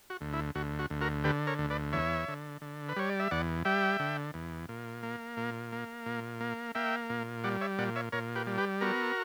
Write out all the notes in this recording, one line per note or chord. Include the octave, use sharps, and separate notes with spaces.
F#4
D2
E4
D2 F#4
F#4
D2
F#4 A#4
D3 G4 B4
A#4 C#5
D2
B4 D5
E2 C#5 E5
D3
D3
B4
G3 C#5
D5
E5
E2 D5 F#5
G3 E5 G5
D3
E2
A#2
A#3
A#2
A#3
A#2
A#3
A#3 E5 G5
A#2
G3 D5 F#5
C#5 E5
A#2 D5 F#5
C#5 E5
A#2 A#4 C#5
G4 B4
G3
G4 B4
B3 F#4 A#4